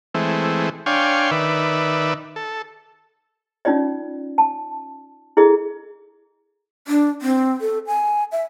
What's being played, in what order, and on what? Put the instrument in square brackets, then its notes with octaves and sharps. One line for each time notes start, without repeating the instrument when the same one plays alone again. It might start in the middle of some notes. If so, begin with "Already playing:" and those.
[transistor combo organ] E3 G#3 A3 C4
D4 C#5 F5 G5 G#5 C6
D#3 B4 D5 E5
A4
[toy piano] C#4 D#4 F4 D5 D#5
A5
E4 G#4 A4 D#5
[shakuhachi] D4
C4
A4
G#5
E5